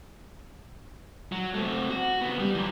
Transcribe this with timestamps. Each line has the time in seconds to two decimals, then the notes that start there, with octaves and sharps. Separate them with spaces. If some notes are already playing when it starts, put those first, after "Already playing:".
1.32 F#3
1.54 A3 C4
1.90 F#4
2.21 C#3 B3
2.40 G3
2.55 E3 F#3